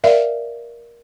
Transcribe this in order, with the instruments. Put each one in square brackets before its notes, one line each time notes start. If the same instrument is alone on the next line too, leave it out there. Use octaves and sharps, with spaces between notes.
[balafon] A#4 D5 E5 F5